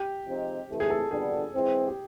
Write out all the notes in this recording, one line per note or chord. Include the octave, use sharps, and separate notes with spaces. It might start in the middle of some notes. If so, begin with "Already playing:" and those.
Already playing: G4
C3 F3 G#3 C4 D#4
C3 E3 A3
G#4
A4
F2 D3 G3 B3 D4 G#4
E3 G#3 C4
G4